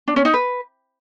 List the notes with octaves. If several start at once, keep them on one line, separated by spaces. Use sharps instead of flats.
D4
C#4
D#4
B4